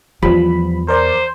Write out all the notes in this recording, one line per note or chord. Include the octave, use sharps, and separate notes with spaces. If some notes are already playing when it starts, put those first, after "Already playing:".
E2 F3 G3 B5
A#4 C5 D5